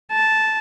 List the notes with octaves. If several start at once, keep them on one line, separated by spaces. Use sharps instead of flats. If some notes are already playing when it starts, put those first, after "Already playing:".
A5